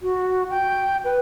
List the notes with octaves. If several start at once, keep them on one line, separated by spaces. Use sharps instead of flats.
F#4
G5
B4